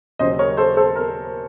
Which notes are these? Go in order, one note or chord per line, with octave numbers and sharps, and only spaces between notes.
D#2 C#3 F#3 C5 D#5
A#4 C#5
A4 C5
A4 C5
A#4